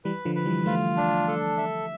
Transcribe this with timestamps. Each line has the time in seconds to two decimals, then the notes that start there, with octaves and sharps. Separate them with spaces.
0.05 E3 G3 B4
0.25 D3 F3
0.35 B4
0.46 E3 G3
0.66 F3 A3 F4
0.97 D4
1.28 A4
1.57 E5